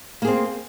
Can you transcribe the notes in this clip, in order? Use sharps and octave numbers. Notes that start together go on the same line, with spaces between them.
A#3 C4 G#4